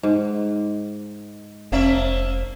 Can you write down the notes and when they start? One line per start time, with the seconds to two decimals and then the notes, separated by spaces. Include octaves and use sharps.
0.03 G#2
1.72 F1 A#3 C4 E5